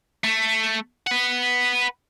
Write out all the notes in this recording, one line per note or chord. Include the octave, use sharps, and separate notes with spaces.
A3
B4 F#5